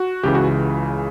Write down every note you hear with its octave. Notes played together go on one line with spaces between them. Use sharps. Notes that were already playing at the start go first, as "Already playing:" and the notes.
Already playing: F#4
C#2 C#3 E3 G4
F#4